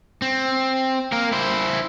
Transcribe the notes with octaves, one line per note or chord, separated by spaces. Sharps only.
C4
A#3 A#4
E4 C5